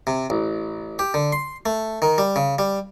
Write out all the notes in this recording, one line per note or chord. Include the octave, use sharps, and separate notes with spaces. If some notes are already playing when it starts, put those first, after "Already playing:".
C3
A1
G4
D3
C6
A3
D#3
G3
C#3
G3